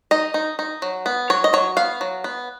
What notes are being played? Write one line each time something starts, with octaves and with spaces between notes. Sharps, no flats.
D#4 D#5
D#4
D#4
F#3
B3
F#3 C#5
D#5
F#3 C#5
B3 F5
F#3
B3